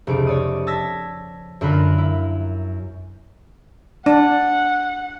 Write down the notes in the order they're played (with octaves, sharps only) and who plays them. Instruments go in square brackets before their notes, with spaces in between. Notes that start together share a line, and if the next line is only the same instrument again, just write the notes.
[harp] F1 C#2 D7
C#5 D5 D#6
A5 E6 G#6 A#6 B6
F#2 D3 F4 A#4 B5 F#6
E4
[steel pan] D4 [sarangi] F#5